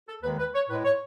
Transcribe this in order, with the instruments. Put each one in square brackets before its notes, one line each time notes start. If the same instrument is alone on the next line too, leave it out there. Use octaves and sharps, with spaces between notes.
[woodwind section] A4
D#2 D#3 G#3 B4
B4
C#5
A2 G#3 B4
C#5